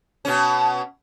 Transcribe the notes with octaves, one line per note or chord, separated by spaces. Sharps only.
B2 C#4